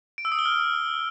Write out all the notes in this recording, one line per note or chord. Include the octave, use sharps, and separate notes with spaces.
D7
E6
D#6
G7
F6